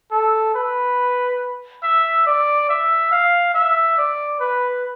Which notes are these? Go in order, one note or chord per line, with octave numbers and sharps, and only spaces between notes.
A4
B4
E5
D5
E5
F5
E5
D5
B4